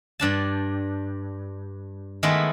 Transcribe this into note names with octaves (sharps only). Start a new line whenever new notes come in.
G2 D4 A5
D#3 G#3 A3 B3 E4